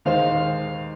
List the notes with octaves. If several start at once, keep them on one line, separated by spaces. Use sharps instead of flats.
D#2 D#3 G#3 D#4 C5 F5